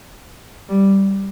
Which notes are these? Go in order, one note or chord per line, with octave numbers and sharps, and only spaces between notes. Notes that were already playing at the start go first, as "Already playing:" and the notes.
G3